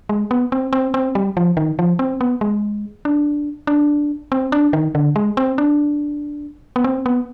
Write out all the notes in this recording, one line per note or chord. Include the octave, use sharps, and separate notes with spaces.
G#3
B3
C4
C4
C4
G3
F3
D#3
F3
C4
B3
G#3
D4
D4
C4
D4
D#3
D3
G#3
C4
D4
B3
C4
B3